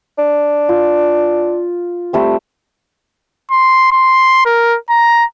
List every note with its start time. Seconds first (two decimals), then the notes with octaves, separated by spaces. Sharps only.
0.18 D4
0.69 F4
2.13 G3 A3 C4
3.51 C6
3.92 C6
4.46 A#4
4.90 A#5